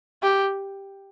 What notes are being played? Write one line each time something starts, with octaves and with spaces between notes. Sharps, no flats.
G4